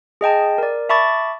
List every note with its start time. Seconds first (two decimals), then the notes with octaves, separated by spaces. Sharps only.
0.21 G#4 D#5 G5 A5
0.58 A#4 D5
0.89 E5 A5 B5 C#6 D6 A6